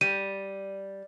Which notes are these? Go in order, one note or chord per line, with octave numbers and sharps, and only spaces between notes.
G3 D#7